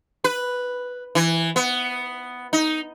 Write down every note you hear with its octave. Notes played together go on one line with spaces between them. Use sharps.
B4
E3
B3
D#4